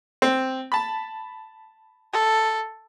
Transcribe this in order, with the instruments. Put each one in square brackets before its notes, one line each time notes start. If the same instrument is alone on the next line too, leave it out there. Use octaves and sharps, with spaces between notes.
[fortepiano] C4
A5 B5
[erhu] A4